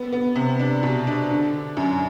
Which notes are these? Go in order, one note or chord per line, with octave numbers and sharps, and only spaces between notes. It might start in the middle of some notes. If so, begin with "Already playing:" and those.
Already playing: B3
B3
C3
D4
B2
D4
D3
D3
F#2